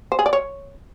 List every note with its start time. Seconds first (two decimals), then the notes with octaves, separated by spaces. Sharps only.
0.12 C5
0.19 G#4
0.26 D5
0.33 C#5